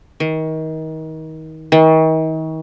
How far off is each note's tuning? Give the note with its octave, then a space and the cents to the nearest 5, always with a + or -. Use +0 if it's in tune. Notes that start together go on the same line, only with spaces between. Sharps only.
D#3 +30
D#3 +40